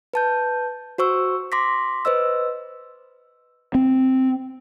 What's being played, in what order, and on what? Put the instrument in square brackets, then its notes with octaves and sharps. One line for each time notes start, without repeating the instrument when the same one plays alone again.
[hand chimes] B4 A5 G6
F#4 C5 C#6 E6
C6 D6 A#6 B6
B4 C5 D#5 E6
[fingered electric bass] C4